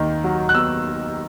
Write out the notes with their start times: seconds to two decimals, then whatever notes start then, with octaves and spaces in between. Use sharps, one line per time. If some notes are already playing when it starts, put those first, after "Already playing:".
Already playing: D#2 D#3
0.24 F#3
0.49 F#6
0.55 B3 E6